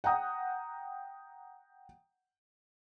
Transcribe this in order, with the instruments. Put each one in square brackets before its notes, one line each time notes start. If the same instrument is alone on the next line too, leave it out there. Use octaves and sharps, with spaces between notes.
[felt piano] F#5 G5 A#5 D#6